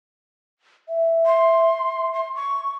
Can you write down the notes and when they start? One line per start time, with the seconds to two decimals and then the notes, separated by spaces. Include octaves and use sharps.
0.89 E5
1.26 C6
2.14 C6
2.35 C#6